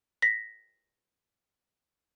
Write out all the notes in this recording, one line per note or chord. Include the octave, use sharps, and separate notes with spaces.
A#6 B6